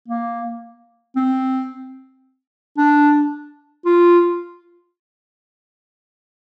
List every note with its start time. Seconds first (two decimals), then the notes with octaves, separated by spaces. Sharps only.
0.08 A#3
1.16 C4
2.78 D4
3.86 F4